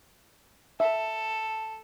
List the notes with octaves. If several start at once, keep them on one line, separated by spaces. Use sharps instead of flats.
A4 E5